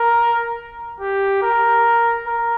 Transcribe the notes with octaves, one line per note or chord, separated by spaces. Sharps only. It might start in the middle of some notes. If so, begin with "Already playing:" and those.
Already playing: A#4
G4
A#4
A#4